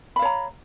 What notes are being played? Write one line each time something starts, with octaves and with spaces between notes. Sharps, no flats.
C#5 F5 A#5 B5